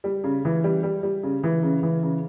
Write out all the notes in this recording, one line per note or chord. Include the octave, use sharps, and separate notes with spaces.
G3
C#3
E3
G3
G3
G3
C#3
E3
C#3
E3
C#3